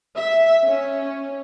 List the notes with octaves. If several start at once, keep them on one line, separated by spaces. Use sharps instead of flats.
E5
C#4